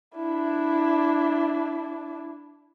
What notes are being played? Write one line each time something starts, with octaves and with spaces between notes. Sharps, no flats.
D4 E4